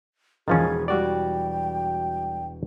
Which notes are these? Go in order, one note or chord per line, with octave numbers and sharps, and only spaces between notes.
E1 D#3 F3 C#4 G#4 A6
G3 F#4 D5 G5